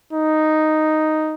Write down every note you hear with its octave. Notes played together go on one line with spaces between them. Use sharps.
D#4